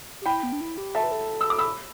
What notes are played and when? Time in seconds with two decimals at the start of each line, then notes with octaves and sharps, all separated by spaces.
0.21 G4
0.26 E4 G5 B5
0.43 B3
0.52 D4
0.61 E4
0.78 G4
0.95 A4 E5 A5
1.03 B4
1.12 A4
1.41 E6
1.50 D6
1.58 B5 E6